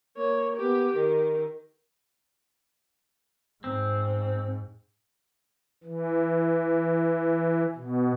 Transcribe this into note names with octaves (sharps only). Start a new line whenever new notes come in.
A#3 C#5
B3 G4
D#3
G#2 C4
E3
B2